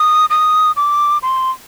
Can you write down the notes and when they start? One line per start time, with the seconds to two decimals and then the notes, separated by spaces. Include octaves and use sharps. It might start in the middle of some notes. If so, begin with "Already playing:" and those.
Already playing: D#6
0.30 D#6
0.76 D6
1.23 C6